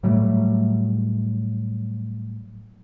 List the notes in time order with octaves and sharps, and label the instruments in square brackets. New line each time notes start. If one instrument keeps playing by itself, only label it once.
[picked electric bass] A2 F#3 G3 A3